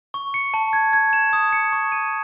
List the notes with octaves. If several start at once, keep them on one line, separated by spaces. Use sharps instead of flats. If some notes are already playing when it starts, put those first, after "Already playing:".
C#6
C#7
A5
G#6
G#6
E7
D#6
C#7
C#6
D#7